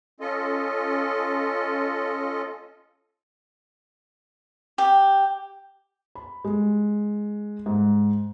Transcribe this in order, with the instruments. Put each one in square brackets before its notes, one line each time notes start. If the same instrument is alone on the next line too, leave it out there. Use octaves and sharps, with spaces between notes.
[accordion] C#4 F4 A4 D#5
[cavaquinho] G4
[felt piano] B5
G#3
G#2